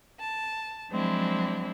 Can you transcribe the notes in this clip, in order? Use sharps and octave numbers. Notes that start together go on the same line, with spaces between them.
A5
F3 F#3 G#3 C4 D4 E4